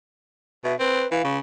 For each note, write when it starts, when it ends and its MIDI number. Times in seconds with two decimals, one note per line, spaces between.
0.65 0.74 47
0.65 0.76 76
0.79 1.05 60
0.79 1.10 71
1.12 1.21 52
1.12 1.35 77
1.24 1.39 49